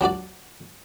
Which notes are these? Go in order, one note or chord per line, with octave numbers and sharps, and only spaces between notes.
F#3 D4 F#4 D5